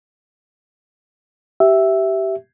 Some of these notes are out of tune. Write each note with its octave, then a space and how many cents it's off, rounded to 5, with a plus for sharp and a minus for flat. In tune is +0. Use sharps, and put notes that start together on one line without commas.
G4 -20 E5 +0